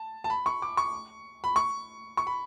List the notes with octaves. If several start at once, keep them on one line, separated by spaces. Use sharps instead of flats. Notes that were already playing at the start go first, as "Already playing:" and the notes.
Already playing: A5
A5
B5
C#6
D6
C#6
B5
C#6
C#6
B5